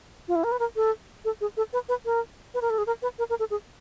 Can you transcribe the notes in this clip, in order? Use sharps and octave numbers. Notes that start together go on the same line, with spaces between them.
F4
E4
A#4
B4
A#4
A4
A4
G#4
A4
B4
B4
A#4
B4
A#4
A4
G#4
A#4
B4
A#4
A#4
A4
G#4